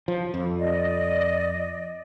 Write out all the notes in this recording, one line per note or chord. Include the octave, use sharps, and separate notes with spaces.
F3
F2
D5 D#5